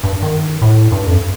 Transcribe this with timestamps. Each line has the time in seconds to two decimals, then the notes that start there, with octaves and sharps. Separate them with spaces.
0.04 G2
0.23 D#3
0.62 A2
0.92 G2
1.07 F2